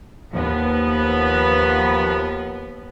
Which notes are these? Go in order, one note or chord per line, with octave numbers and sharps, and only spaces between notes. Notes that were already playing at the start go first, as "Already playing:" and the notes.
D#2 F3 B3